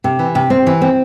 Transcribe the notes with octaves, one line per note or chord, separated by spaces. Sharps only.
C3
E3
C3
C4
E3
C4